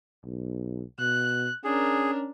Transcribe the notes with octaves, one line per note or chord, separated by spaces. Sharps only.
B1
B2 F#6
C#4 D4 G#4 A#4